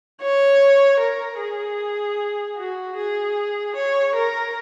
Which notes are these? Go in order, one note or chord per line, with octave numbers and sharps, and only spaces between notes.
C#5
A#4
G#4
F#4
G#4
C#5
A#4